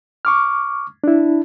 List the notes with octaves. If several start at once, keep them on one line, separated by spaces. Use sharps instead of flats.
C#6 D6 F6
D4 E4